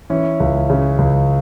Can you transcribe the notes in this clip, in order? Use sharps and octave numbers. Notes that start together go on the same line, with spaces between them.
E3 C#4
C#2
C#3
C#2